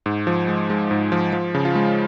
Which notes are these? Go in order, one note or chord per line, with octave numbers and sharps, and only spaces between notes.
G#2
F3
G#3
G#3
G#2
F3
F3
C#3
F4
G#3